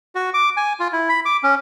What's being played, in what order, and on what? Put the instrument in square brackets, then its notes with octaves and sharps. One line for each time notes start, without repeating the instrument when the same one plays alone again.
[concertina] F#4
D6
G#5
F4
E4
B5
D6
C#4